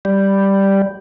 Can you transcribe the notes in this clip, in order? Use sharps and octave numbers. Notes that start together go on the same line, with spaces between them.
G3